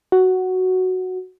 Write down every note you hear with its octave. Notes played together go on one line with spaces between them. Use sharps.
F#4